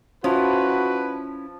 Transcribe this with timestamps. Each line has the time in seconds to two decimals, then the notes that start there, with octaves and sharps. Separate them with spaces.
0.24 F3 C#4 E4 F#4 B4